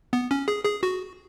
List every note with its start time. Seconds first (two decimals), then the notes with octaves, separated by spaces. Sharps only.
0.13 B3
0.31 C#4
0.48 G#4
0.65 G#4
0.83 F#4